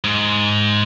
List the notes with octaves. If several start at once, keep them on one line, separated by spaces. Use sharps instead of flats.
G#2